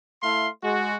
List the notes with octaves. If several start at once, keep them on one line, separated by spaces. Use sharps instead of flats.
A3 E4 F5 C6
G#3 F#4